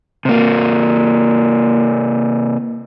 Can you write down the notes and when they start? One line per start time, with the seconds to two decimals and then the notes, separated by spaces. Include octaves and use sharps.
0.25 C3 A#3